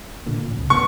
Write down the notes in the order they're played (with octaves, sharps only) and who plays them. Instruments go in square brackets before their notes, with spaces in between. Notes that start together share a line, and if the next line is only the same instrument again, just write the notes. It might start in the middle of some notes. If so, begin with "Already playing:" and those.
[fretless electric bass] A1 A#2 D3
A1
C2
[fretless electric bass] D1 D2 B3 [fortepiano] C#6